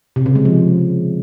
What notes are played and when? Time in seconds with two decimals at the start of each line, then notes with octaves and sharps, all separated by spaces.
0.16 C3
0.26 C#3
0.35 G#3
0.45 F3